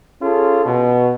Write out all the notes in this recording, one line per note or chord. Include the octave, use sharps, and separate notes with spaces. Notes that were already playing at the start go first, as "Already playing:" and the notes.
C#4 F4 G#4 A4
B2